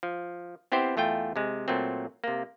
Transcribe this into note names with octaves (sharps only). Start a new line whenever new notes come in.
F3
B3 C4 E4 G4 C5
E2 A3 F4 G5
C3 G#3
A#2 F#3 A3 C4
C3 A#3